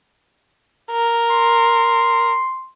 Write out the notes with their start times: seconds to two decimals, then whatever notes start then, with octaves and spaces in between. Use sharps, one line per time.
0.91 A#4
1.30 C6